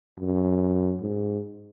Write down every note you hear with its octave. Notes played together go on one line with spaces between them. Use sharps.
F#2
G#2